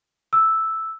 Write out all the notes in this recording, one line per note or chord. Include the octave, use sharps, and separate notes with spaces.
E6